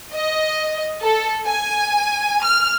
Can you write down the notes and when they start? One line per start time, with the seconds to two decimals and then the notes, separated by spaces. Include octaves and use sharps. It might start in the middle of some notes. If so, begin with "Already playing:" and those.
0.14 D#5
1.02 A4
1.46 G#5
2.43 F6